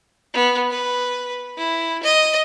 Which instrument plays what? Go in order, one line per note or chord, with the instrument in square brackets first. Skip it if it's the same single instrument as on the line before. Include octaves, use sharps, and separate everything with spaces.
[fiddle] B3
B4
E4
D#5